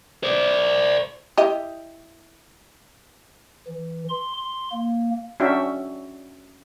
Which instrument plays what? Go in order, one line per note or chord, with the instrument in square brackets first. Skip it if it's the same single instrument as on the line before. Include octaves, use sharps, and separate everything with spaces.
[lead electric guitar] C5 D5
[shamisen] E4 G4 D#5
[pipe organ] E3
C6
C6
A#3
[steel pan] C#4 D4 F#4 E5 G5